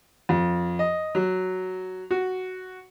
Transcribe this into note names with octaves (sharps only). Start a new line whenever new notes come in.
F2
D#5
F#3
F#4